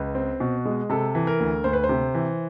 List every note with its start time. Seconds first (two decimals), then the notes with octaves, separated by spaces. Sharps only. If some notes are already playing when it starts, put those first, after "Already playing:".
Already playing: C#2 B4
0.15 C4
0.40 B2
0.65 G#3
0.90 C3 A4
1.15 E3
1.27 A#4
1.40 D2
1.64 D2 C5
1.73 B4
1.84 C5
1.89 C3
2.14 E3